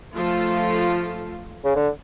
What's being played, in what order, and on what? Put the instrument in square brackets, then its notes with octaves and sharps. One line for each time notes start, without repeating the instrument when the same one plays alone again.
[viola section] F3 A3 F4 A4
[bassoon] C#3
D3